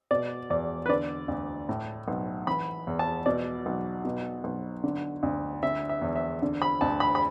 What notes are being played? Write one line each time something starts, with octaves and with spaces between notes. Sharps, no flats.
B2 D5
E2 D5
B4
D3 D5
D2
A2
B1
E3 B5
E2
A5
B2 D5
B1
B2
B1
D3
D2
D3 E5
E5
E2
E5
D3
B5
D2 A5
B5
B5